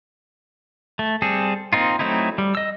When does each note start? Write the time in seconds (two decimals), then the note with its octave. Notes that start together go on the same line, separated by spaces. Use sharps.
0.99 A3
1.22 G3 C4 G#4 A4
1.73 A#3 C4 D#4 F4
1.99 F#3 A3 C4 D#4 E4
2.38 G3
2.55 D#5 E6